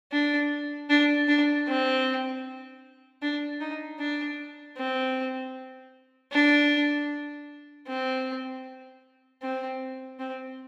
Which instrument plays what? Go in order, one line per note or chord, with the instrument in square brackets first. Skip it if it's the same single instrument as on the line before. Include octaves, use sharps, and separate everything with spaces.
[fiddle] D4
D4
D4
C4
D4
D#4
D4
C4
D4
C4
C4
C4